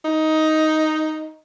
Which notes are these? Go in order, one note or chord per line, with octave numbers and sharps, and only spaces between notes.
D#4